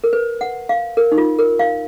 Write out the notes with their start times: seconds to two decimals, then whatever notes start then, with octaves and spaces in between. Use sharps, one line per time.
0.04 A#4
0.13 B4
0.41 F#5
0.69 F5
0.97 A#4
1.12 D#4
1.18 F4
1.39 A#4
1.59 F5